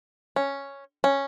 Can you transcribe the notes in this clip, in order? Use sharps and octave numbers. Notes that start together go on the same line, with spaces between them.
C#4
C#4